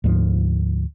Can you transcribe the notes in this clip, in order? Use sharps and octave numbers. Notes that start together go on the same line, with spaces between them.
D2 G#2 F3